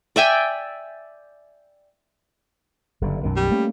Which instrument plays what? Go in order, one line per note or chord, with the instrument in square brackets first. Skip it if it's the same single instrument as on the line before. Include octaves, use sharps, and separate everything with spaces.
[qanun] D5 E5 G5 G#5
[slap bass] F#1 G2 D3
B1 F#2 D#3
[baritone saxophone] G3
[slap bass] A3 A#3 C#4